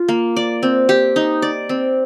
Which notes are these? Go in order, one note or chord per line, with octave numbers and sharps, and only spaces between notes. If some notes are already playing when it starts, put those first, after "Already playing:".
Already playing: F4
A#3
D5
C4
G4
D#4
D5
C4